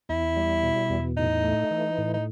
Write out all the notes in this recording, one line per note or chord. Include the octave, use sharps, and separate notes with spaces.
E2 E4
G3
B2
E2
A2 D#4
A3
E3
A2
D#4